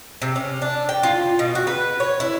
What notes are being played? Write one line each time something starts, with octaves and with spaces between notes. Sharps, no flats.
C3
C#4
D4
G5
F4
B2
F#4
B4
C#5
E4